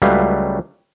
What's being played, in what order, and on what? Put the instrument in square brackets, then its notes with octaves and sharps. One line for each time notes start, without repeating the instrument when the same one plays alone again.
[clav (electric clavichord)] C#2 F#3 G3 A3 B4 F5